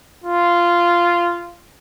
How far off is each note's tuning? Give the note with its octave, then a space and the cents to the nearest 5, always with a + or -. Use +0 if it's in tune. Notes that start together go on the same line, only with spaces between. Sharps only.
F4 -10